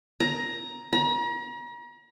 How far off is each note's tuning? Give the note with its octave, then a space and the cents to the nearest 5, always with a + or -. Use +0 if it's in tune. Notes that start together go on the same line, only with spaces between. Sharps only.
A#5 +10
A#5 +40